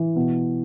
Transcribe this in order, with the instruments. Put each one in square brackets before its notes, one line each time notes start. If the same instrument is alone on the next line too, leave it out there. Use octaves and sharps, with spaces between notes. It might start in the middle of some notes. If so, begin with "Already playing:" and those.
Already playing: [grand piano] E3
B2